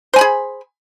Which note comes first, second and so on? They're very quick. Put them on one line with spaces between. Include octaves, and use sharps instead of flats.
C5 G#5 B5 G#4